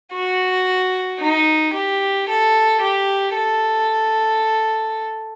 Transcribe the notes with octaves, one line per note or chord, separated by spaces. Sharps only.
F#4
D#4
G4
A4
G4
A4